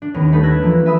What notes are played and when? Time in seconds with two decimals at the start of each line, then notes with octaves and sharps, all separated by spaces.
0.02 D4
0.14 D#2 B3 C#4
0.32 G3 A3 D#4 B4 B5
0.43 E6 F#6 G#6 A#6 B6
0.62 E3 F3 G#3 A#3 D4
0.86 B4 E5 G#5 B5 D#6 E6